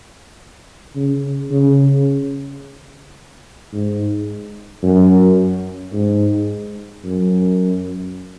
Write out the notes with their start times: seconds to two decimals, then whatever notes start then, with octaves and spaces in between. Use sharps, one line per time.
0.96 C#3
1.51 C#3
3.73 G#2
4.83 F#2
5.93 G#2
7.04 F#2